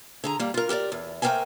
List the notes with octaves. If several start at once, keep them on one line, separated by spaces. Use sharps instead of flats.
D3 G#4 A#5
G3 A#3
F4 A#4
G4 A#4 C#5 D5
E2
A3 A#3 A#4 C5 G5 G#5